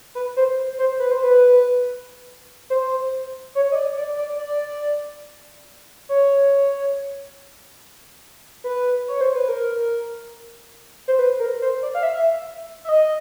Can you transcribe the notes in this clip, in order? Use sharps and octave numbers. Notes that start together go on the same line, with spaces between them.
B4
C5
C5
B4
C5
B4
C5
C#5
D#5
D5
D5
D5
D5
C#5
B4
C#5
C5
B4
A#4
C5
B4
A#4
C5
D5
F5
E5
E5
D#5